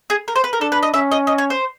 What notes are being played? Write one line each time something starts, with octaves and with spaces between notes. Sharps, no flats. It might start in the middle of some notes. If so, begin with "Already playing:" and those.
G#4
A#4
C5
B4
A#4
D4 A4
B4
D#5
C#4 E5
D#5
D#5
C#5
C5